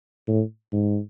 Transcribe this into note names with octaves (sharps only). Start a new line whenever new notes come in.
A2
G#2